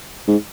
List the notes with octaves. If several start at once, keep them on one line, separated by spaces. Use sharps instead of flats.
G#2